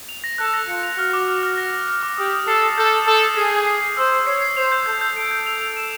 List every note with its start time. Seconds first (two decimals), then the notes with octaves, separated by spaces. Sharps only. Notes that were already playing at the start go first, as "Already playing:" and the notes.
0.09 F7
0.24 A#6
0.38 A4 F#6
0.54 A#6
0.68 F4 C#7
0.83 F7
0.98 F#4 F6
1.13 D6
1.28 F6
1.43 F6
1.58 A#6
1.73 A#6
1.88 F6
2.03 D6
2.18 G4 D#6
2.33 D#6
2.47 A4 C7
2.63 D#6
2.77 A4 G6
2.92 D#6
3.07 A4 D#6
3.22 D#6
3.37 G#4 C7
3.53 G#6
3.67 C7
3.82 C7
3.97 C5 E6
4.12 E6
4.26 C#5 C7
4.42 C7
4.56 C5 F7
4.72 G6
4.86 A4 G6
5.01 G6
5.16 A4 D7
5.31 G6
5.47 F7
5.61 F7
5.77 E7